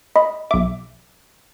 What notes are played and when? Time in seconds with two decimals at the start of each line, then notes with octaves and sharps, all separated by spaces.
0.16 D#5 B5
0.51 B1 E5 D6